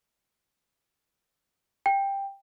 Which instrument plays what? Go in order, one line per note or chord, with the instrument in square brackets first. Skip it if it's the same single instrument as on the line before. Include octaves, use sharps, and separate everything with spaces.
[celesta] G5